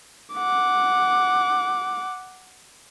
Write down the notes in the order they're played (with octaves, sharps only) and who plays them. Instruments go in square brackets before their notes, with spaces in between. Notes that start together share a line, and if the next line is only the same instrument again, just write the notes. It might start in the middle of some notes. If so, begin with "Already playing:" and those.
[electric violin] F#5 D6